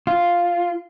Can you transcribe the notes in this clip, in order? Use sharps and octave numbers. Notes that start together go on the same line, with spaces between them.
F4